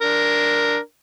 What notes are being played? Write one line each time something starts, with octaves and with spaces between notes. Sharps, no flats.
D4 A#4